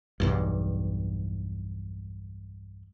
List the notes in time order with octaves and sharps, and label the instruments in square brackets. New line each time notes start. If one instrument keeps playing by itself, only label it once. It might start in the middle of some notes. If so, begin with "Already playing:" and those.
[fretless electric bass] B1 E2 G2